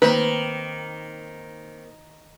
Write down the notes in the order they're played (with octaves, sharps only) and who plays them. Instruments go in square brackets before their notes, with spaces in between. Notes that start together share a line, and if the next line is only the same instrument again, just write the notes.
[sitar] D#3 [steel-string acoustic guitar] A#3 C4 A#4 [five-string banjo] B4